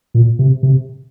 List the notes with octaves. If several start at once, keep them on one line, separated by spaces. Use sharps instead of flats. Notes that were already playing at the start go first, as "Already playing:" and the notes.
A#2
C3
C3